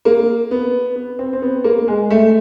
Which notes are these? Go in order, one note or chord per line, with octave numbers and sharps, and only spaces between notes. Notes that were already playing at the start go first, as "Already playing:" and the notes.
A#3
B3
B3
C4
C4
B3
A#3
G#3
A3